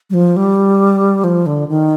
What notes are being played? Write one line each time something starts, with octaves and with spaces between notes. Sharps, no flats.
G3
F3
G3
F3
D3
D#3